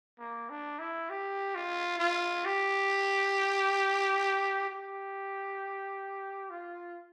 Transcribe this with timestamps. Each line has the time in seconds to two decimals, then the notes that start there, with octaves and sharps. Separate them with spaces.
0.19 A#3
0.50 D4
0.79 E4
1.10 G4
1.55 F4
1.99 F4
2.45 G4
4.69 G4
6.50 F4